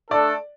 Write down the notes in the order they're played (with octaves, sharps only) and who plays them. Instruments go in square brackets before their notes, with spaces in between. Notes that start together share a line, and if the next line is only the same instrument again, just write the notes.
[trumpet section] A3 D4 A4 [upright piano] D5